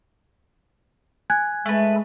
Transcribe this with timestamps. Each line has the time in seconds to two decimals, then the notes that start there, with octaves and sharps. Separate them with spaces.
1.30 G#5 F#6 G#6
1.66 G#3 A3 B4